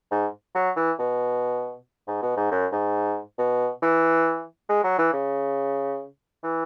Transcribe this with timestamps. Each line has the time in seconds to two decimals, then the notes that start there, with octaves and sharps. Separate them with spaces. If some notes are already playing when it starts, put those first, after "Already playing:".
0.11 G#2
0.55 F#3
0.76 E3
0.99 B2
2.07 G#2
2.22 B2
2.37 G#2
2.51 F#2
2.72 G#2
3.38 B2
3.82 E3
4.69 G#3
4.84 F#3
4.98 E3
5.13 C#3
6.43 E3